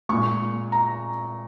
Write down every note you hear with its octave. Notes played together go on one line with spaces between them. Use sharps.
A#2 G#3 C#6
A#5